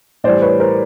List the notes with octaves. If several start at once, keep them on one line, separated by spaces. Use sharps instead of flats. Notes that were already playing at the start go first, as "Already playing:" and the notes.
A2 E3 G3 C5 D5
B4 C#5
A#4 C5